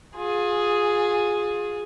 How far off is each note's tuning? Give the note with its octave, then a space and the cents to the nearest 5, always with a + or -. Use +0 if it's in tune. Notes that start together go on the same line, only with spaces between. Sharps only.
F4 +35 G#4 +0